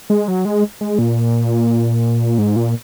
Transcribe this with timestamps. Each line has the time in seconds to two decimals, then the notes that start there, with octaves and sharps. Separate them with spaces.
0.10 G#3
0.28 F#3
0.45 G#3
0.81 G#3
0.99 A#2
2.38 G#2
2.56 A#2